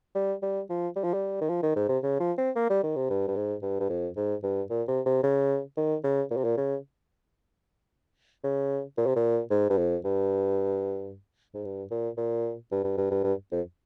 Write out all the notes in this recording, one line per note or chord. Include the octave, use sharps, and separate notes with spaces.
G3
G3
F3
G3
F3
G3
D#3
F3
D#3
G#2
C3
C#3
F3
C4
A#3
G3
D#3
C3
G2
G2
G#2
G2
G2
F2
G#2
G2
A#2
C3
C3
C#3
D#3
C#3
A#2
C3
A#2
C#3
C#3
A#2
C3
A#2
G#2
G2
F2
G2
G#2
G2
A#2
A#2
G2
G2
G2
G2
G2
F2